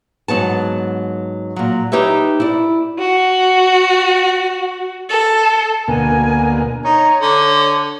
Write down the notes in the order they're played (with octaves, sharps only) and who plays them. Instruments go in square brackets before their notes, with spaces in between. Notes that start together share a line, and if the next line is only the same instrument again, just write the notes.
[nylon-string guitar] G#2 F#3 B3 A5
A#2 F#3
D#4 G4 B4 C#5 E5
E4 D5
[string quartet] F#4
A4
[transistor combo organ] D2 B2 A#3 [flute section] G#5
[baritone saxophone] D#4 [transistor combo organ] C#5 [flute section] A#5
[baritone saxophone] D3 [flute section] D6